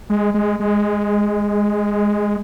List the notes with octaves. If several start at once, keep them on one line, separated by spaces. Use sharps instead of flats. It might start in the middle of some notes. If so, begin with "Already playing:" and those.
G#3
G#3
G#3